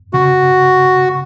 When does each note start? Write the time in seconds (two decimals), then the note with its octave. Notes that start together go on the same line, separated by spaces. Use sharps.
0.13 C#3 F#4